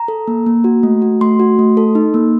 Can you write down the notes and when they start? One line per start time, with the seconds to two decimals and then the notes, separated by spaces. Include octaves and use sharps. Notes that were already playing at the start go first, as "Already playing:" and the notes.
Already playing: A#5
0.08 A4
0.28 A#3
0.46 A#3
0.64 F#4
0.83 A3
1.02 F#4
1.21 A3 C6
1.40 F#4
1.59 A3
1.77 A4
1.95 D#4
2.14 A#3